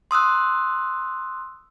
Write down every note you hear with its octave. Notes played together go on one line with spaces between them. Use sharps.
C6 D#6 E6 F#6